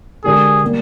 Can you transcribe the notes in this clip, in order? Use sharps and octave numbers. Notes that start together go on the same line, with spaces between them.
D3 G#3 D4 G4 G#4 A#4
G3 A#3